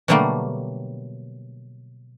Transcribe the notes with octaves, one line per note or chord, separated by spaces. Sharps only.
B2 D3 F#3 G3 A3 A#3